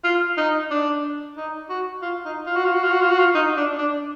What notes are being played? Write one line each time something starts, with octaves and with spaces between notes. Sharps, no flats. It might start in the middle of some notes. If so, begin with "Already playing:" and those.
F4
D#4
D4
D#4
F#4
F4
D#4
F4
F#4
F4
F#4
F4
F#4
F4
F#4
F4
D#4
D4
D4